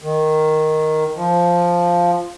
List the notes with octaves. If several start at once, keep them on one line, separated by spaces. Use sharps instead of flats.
D#3
F3